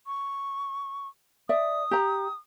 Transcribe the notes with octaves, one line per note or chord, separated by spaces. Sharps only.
C#6
D5 E5 D#6
G4 A#5